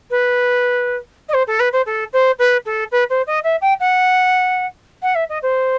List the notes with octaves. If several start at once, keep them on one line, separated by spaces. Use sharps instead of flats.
B4
D#5
C5
A4
B4
C5
A4
C5
B4
A4
B4
C5
D#5
E5
G5
F#5
F#5
E5
D#5
C5